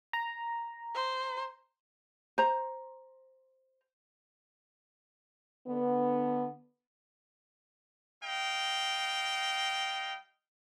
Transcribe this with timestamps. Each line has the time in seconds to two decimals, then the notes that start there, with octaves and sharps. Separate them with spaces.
0.13 A#5
0.95 C5
2.38 C5 A#5
5.68 D3 B3
8.23 G3 D#5 F5 G5